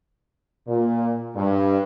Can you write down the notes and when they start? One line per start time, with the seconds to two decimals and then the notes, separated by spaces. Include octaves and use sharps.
0.68 A#2
1.36 G2